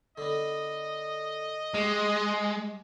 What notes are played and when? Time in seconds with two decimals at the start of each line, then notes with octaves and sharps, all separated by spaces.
0.18 D3 B3 D#5
1.74 G#3 G4 F5